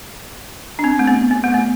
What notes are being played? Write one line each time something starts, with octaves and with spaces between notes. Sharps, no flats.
D4
C4
A3
B3
B3
A3
B3